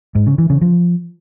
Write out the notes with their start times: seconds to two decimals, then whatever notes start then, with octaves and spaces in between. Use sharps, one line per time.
0.15 G#2
0.27 C#3
0.38 E3
0.50 C#3
0.61 F3